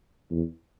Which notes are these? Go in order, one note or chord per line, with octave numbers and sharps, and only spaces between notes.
E2